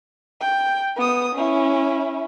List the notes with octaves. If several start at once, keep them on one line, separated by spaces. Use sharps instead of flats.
G5
B3 D#6
C#4 E4